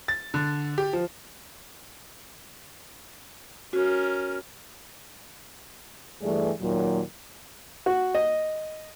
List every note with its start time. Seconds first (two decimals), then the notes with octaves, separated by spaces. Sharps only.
0.08 A6
0.34 D3
0.78 G4
0.93 F3
3.73 C#4 F#4 A#4
6.21 G2 E3 G3 A3 G#4 D5
6.60 D#2 A#2 D#3 F#3
7.86 F#4
8.15 D#5